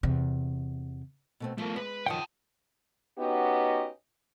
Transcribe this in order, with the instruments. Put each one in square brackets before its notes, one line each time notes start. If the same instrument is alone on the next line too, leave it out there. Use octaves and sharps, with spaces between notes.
[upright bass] E2 C3
[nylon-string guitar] B2 A3 C4
[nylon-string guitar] F3 [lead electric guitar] A3 A#4
[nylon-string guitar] G#3 [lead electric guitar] B4
[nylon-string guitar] F#2 D#3 F3 [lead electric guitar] F#5 A5 [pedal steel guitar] G5 D#6
[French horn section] B3 C#4 D#4 F#4 G4 D#5